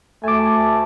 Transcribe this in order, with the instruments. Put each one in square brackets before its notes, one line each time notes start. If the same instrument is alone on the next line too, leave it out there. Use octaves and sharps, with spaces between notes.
[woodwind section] D2 A5 [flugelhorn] A3 [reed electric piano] G#5 D6